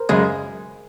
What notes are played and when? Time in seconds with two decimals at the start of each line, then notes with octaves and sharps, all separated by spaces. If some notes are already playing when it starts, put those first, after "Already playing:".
Already playing: A#4 C5
0.09 F#2 C#3 G#3 G#4